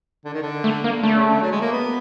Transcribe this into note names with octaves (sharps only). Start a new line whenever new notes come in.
D3
D#3
D3
A3
A#3
D3 A3
C#3
D3
F#3
G#3
A#3
B3